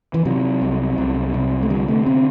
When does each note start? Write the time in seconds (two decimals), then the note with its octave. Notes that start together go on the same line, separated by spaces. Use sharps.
0.14 E3
0.25 C3 F#3
0.62 C2
0.98 C2
1.34 C3
1.62 A3
1.70 D3 G3
1.88 A3
2.06 D3 C4